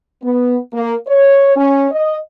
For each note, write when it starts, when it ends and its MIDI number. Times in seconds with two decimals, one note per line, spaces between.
0.23 0.58 59
0.74 0.94 58
1.07 1.54 73
1.56 1.88 61
1.91 2.16 75